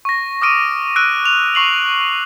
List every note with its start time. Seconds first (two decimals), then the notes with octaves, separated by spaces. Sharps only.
0.05 C#6 A#6
0.42 D6 D#6 F6 D7 D#7
0.96 E6 F#6 D7 D#7
1.25 F7
1.55 C#6 C7 F#7